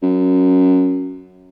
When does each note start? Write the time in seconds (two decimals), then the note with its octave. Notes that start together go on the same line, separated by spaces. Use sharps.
0.03 F#2